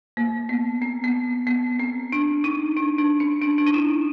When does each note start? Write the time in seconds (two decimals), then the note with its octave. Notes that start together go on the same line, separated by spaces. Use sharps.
0.17 A#3
0.49 B3
0.82 C4
1.04 B3
1.47 B3
1.79 C4
2.12 D4
2.44 D#4
2.77 D4
2.98 D4
3.20 C#4
3.42 D4
3.58 D4
3.66 D#4
3.74 E4